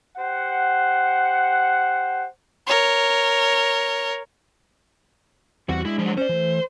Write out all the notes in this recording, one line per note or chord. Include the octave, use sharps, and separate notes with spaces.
G4 C5 F#5
A#4 C#5
E2 G3 C4 F#4 F#5
G#3 D4 E4
F3 F#3
C#4 C5 D5
E3 A3